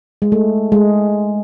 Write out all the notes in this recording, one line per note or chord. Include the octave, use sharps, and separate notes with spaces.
G#3
A3
G#3